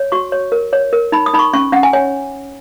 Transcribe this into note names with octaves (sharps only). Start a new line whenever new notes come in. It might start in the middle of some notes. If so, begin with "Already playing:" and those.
Already playing: C#5
F#4 C#6
C#5
A#4
C#5
A#4
D#4 B5
D#6
D#4 B5
C#6
C#4 C#6
C#4 F#5
G#5
C#5 G#5